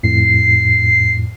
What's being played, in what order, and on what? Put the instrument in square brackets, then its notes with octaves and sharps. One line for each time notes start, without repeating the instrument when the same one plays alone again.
[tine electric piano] F2 A2 [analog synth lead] C7